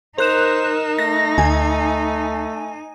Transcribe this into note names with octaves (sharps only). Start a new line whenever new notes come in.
D#4 A#4 C5 F#6 E7
A3 A#6
D2 G#5